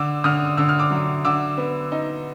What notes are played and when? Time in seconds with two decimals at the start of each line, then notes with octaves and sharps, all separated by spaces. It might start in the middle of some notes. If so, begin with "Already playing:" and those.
Already playing: D3 D6 E6
0.24 D3 D#6 F6
0.57 D3 E6
0.69 F6
0.79 D6 E6
0.91 F#3
1.25 D3 D6 E6
1.58 B3
1.92 D#4